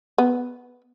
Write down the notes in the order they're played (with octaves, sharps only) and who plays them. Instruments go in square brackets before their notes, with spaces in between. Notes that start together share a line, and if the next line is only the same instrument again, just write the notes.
[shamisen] B3